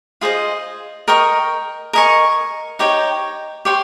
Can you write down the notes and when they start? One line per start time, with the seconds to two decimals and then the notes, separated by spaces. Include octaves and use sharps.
0.21 F4 G#4 C5 D#5
1.08 A#4 D#5 G5 C#6
1.93 A#4 D#5 G#5 C#6
2.79 D#4 G4 C#5 G5
3.65 G4 C#5 G5 C6